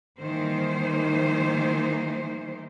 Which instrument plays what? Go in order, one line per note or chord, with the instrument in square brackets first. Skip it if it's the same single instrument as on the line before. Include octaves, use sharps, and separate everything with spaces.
[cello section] D#3 E3 G3 A#3 D#4 C5